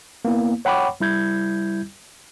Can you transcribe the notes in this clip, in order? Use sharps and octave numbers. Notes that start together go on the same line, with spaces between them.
A#3 B3 E4
C#5 F#5 G5 B5 C#6 D6
G3 E4 G6 G#6